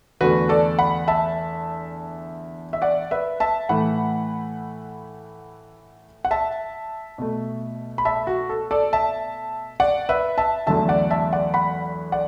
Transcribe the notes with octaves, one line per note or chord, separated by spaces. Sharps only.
E2 D3 A3 F#4 B4
A4 D5
F#5 B5
E5 A5
E5
D5 F#5
B4 E5
E5 A5
A2 E3 A3 F#5 B5
F#5
E5 A5
B2 A3
B5
E5 A5
F#4
A4
A4 D5
E5 A5
D5 F#5
B4 E5
E5 A5
E2 D3 F#3 A3 E5 A5
D5 F#5
E5 A5
D5 F#5
F#5 B5
D5 F#5